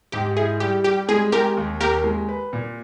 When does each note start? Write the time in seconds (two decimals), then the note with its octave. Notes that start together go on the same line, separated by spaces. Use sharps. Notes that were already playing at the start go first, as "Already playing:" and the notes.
0.12 G#2 G4
0.37 E4 G#4
0.60 G3 G4
0.84 G3 G4
1.09 G#3 G#4
1.32 G#3 G4 A#4
1.57 D#2
1.80 D#2 G4 A#4
2.04 G#3
2.29 B4
2.53 A#2